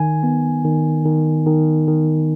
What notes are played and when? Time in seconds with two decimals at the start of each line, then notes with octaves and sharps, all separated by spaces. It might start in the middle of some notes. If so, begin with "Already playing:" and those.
Already playing: D#3 G#5
0.23 B3
0.65 D#3
1.05 D#3
1.47 D#3
1.88 D#3